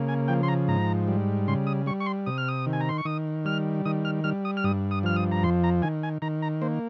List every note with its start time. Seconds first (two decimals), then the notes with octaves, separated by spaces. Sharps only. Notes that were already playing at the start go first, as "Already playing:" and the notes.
Already playing: C#3 A#3
0.08 G#5
0.28 F3 G5
0.43 C6
0.48 A#5
0.68 G#2 A#5
1.08 G3
1.48 C#3 C6
1.67 D#6
1.86 G3 C#6
2.00 C#6
2.06 C6
2.26 C3 D#6
2.38 F6
2.48 D#6
2.66 D#3
2.73 G#5
2.81 A#5
2.89 C6
2.98 C#6
3.05 D#3 D#6
3.45 G3 F6
3.85 D#3 D#6
4.05 F6
4.24 G3 F6
4.45 D#6
4.57 F6
4.64 G2 D#6
4.91 D#6
5.03 F3 F6
5.16 D#6
5.32 A#5
5.43 F2 C6
5.64 A#5
5.82 D#3 G#5
6.03 G#5
6.22 D#3 A#5
6.42 A#5
6.62 A#3 C5